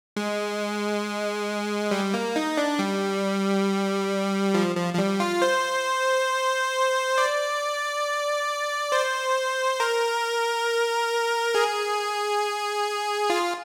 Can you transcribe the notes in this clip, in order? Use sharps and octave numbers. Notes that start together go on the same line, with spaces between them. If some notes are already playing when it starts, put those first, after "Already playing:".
G#3
G3
A#3
D#4
D4
G3
F3
F3
F3
G3
F4
C5
D5
C5
A#4
G#4
F4